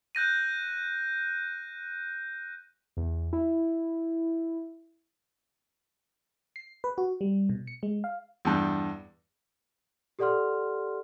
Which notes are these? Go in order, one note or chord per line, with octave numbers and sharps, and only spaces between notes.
F#6 G6 A#6 D#7
E2
E4
C7
B4
F#4
G3
B2
C#7
G#3
F5
E2 G2
G4 A4 D5 F#5 C6 F6